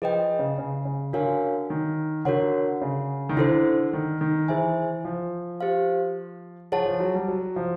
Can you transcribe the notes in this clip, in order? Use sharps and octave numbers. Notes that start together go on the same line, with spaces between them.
F3 G#4 B4 D#5 G5
C#3
C#3
C#3
D3 F#4 A#4 C#5 F5 G#5
D#3
D3 F#4 A#4 C#5 F#5
C#3
D#3
D3 E4 A4 C5
D#3
D#3
E3 G#4 C5 E5 G#5
F3
G4 C5 F5
F3 G#4 C#5 F#5 A5
F3
F#3
G3
F#3
F3